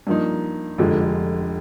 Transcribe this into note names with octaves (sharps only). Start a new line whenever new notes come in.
G2 F3 A#3 D#4
F1 F2 D3 F3 G#3